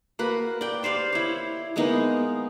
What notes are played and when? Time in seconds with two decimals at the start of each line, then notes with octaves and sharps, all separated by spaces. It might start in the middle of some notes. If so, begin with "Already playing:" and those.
0.19 A#3 F#4 B4
0.61 D5 G5
0.83 G4 C5 D5 F5
1.13 E4 C#5
1.76 G#3 A#3 B3 D#4